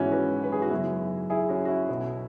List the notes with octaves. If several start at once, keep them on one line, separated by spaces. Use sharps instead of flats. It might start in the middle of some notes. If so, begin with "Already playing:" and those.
Already playing: G#1 G#2 E3 G#3 B3 C#4 E4 F#4
F#4 B4
B4
G#4
F#4
F#2 C#3 F#3 B3 E4
E4 G#4
C#4 F#4
F#4
E4
B1 B2 F#3 B3